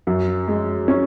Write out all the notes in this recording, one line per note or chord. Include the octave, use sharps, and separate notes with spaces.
F#2
G#3
C#4